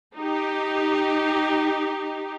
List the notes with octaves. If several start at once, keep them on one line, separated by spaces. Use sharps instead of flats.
D#4 G4